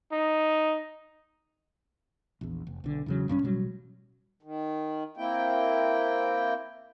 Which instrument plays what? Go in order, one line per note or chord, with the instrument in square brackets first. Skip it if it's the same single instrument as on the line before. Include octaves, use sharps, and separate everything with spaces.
[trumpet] D#4
[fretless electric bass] A#1 E2
F1
B1 D3
E2 C#3 F#3
B1 G2 G3 C#4
A1 B2 F#3 G3
[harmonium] D#3
A#3 C4 E4 G5